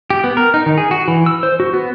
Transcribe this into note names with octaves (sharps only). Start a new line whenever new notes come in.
G4
B3
A#4
D#4
D#3
G#4
F#4
E3
E6
C5
F#4
B3